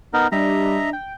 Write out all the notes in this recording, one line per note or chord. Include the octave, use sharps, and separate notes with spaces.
B3 D#4 A#4
G3 D4 D#5 E5 A#5
G5